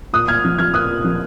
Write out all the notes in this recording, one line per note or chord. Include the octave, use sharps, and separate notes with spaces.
A#2 D#6 F#6
A#2 F6 G#6
F3
F3 F6 G#6
A#2 D#6 F#6
A#2
F3